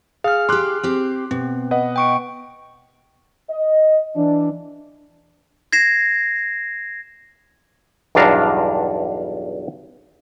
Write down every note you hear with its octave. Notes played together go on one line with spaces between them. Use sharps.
G#4 F5 F6
G4 F5 C6 D6 F#6
C4 G4
B2 C4
B4 D#5 F#5
G5 C#6 D7
D#5
E3 D4
G#6 A#6 C7 E7
B1 E2 G2 D4 F5 A#5